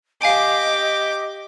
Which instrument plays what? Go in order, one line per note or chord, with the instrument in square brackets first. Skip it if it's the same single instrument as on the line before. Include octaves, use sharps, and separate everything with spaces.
[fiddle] G4 D6 [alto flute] D#5 [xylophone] F5 G#5 D7